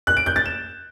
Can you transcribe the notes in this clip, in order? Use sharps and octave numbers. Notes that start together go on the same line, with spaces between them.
F#6
D7
G6
A6
E7